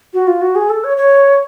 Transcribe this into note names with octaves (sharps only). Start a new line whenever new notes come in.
F#4
F4
F#4
G#4
A4
C#5
C#5